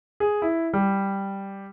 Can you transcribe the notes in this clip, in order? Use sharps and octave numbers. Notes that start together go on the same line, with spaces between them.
G#4
E4
G3